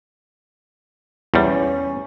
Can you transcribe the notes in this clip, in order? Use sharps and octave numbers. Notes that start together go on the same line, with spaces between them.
E2 G3 C#4